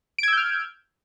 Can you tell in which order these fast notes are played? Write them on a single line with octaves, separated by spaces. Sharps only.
D7 G#6 E6 G6 F6